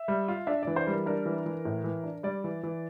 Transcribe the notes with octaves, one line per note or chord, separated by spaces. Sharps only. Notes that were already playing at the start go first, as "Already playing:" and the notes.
Already playing: E5
G3
F4
D4 E5
E3 D5
C5
G3 A#4
D4 A#4
E3
E3
A2
E3
D4
G3 D5
E3
E3